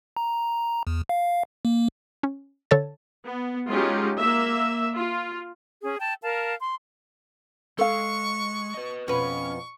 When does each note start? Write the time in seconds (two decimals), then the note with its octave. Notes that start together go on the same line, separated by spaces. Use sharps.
0.17 A#5
0.87 E2
1.09 F5
1.65 A#3
2.23 C#4
2.71 D3 A4 C#5 A5 A6
3.24 B3
3.70 F#3 G#3 C#4 D#4 F4 G4
4.18 A#3 E5
4.94 F4
5.83 C#4 G#4
5.98 G5 A5
6.23 A#4 F5 A5
6.61 C6
7.78 G#3 A4 F5 C#6
8.74 B4 D#5
9.08 F2 B2 C#4 B4 C#6